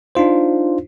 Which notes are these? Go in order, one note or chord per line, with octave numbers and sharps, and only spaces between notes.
D4 D#4 F4 C5